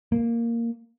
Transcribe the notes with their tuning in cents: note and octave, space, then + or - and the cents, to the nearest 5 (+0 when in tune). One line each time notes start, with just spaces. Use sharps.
A#3 -5